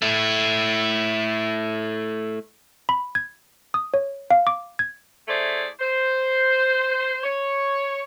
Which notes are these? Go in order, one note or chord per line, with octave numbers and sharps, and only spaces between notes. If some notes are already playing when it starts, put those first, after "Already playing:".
A3 E4
B5
G#6
D#6
C#5
F5
D6
G#6
A3 E4 G#4 C5 D5
C5
C#5